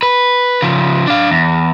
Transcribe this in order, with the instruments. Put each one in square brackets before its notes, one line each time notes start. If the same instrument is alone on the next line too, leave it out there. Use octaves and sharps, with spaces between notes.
[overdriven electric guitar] B4
C#3 F3
D4 F5
E2